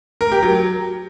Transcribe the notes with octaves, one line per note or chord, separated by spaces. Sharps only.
A#4
G4
F#3